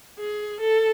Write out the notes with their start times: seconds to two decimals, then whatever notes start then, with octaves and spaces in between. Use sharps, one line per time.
0.19 G#4
0.60 A4